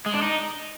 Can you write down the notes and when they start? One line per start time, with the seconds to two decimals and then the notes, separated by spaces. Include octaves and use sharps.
0.06 G#3
0.14 D4
0.22 D#4